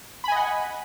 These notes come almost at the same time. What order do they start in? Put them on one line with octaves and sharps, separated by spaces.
B5 G#5 D#5 F#5